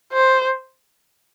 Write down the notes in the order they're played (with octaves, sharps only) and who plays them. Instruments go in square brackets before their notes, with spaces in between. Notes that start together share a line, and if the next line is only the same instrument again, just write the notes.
[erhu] C5